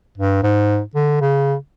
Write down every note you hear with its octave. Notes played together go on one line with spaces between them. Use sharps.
G2
G#2
D3
C#3